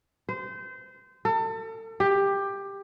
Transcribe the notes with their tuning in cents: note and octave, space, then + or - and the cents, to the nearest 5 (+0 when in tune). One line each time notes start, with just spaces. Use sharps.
C5 -25
A4 +35
G4 +15